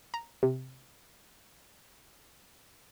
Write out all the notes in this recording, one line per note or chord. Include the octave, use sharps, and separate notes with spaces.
A#5
C3